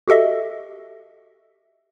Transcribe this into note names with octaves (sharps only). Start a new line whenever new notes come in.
F#4 G4 A4 D#5 E5